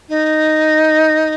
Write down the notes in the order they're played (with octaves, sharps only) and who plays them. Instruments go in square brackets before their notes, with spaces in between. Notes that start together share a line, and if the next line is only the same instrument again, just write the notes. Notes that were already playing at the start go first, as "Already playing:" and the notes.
[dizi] D#4